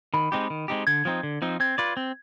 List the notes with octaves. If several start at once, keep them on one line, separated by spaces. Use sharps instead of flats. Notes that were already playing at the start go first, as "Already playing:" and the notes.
D#3 B5
G#3 C4 D#4 G4
D#3
G#3 C4 D#4 G4
D3 G#6
F3 C4 D#4
D3
F3 C4 D#4
C4 G#6
F4 B4 D5
C4